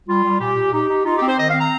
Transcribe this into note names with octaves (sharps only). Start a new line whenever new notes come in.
G3 F4
G3
A#2 G4
A#2
D#4 G4
D#4
D#4 F4
G4
C4
C5
D#3 D#5
F5
C4
A#5